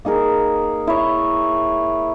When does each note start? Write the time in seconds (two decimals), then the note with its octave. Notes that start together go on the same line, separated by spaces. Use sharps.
0.05 A#3 D#4 G#4 A#4
0.87 E4 C#5